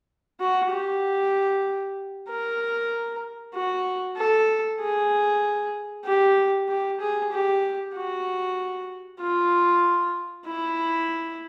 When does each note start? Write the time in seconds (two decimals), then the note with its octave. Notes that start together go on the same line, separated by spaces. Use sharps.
0.40 F#4
0.71 G4
2.29 A#4
3.55 F#4
4.17 A4
4.80 G#4
6.05 G4
6.68 G4
7.00 G#4
7.32 G4
7.95 F#4
9.20 F4
10.47 E4